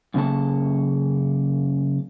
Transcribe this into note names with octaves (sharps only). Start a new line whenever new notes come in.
F#2 C#3 A#3 A4 A5